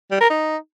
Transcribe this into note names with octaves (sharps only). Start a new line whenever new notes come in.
G3
A#4
D#4